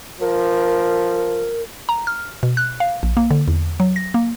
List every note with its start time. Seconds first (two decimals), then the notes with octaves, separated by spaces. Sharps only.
0.20 F3 A#4
1.89 A#5
2.07 F6
2.43 B2
2.57 F#6
2.80 F5
3.03 A#1
3.17 A#3
3.31 D3
3.48 E2
3.80 F#3
3.96 A#6
4.14 A#3